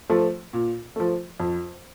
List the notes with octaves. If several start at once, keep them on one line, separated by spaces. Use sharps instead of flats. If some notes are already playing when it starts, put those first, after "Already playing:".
F3 A3
A#2
F3 A3
F2